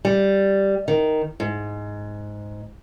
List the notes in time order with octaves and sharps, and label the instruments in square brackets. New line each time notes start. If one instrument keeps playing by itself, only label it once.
[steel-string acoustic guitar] G3
D#3
G#2